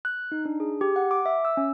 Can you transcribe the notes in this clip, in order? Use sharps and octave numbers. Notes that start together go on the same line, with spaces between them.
F#6
D#4
D4
G#4
G4
F#5
D6
E5
E6
C#4